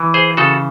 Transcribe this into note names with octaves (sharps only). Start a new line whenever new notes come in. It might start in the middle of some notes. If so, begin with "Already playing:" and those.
Already playing: E3
G#4 C5
C#3 F#4 A4